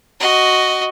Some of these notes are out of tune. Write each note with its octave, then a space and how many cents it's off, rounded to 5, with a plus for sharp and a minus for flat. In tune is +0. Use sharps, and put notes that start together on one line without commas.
F#4 +5 D#5 +0